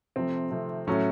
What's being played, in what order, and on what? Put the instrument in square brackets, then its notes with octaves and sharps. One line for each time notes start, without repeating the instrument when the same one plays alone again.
[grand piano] C3 F3 A3 C4
C3 F3 A3
A2 F#3 A3 C#4